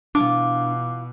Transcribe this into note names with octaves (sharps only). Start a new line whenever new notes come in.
B2 E3 D4 F4 F5 D6